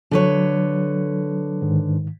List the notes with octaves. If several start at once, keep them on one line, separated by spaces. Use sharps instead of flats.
D3 F#3 B4 C#5
G#2 D#3